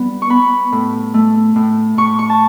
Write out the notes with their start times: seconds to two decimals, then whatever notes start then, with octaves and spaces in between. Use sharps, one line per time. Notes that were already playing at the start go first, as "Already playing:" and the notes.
Already playing: G3 B3
0.22 C#6
0.29 B3 B5
0.72 A2
1.14 A3
1.56 A2
1.98 A2 C#6
2.19 C#6
2.29 A5